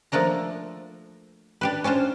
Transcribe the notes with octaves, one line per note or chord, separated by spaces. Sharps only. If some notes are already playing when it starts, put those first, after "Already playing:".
F3 A3 A#3 D4 A#5
D4 G4 B4
C#4 D4 F4 C5